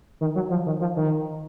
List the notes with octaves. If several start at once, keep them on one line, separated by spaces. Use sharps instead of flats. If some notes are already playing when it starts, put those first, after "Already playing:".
D#3
F#3
F3
D#3
F3
D#3